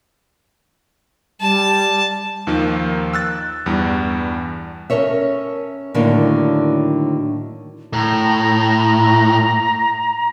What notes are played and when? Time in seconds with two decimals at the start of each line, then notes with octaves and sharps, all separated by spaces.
1.40 G3 A5
2.47 D#2 D#3 F3 A#3
3.13 E6 F#6 A6
3.66 E2 G2 G3
4.90 C#4 A4 A#4 C#5 E5
5.94 A2 D3 D#3 F#3 A#3 D4
7.93 A2 A#5